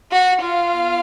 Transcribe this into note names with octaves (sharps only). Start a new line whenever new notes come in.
F#4 F#5
F4 F5
B3